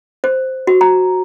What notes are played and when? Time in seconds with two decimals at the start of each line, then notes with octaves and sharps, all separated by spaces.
0.24 C5
0.67 F#4
0.81 A#5